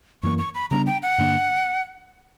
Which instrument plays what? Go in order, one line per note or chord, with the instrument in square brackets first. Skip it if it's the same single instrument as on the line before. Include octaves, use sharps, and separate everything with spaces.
[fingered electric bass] F#2 E3 A#3 [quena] C#6
[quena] C#6
B5
[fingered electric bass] C#3 G3 B3 D4 [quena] A#5
[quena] G5
F#5
[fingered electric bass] G2 D3 A#3 D4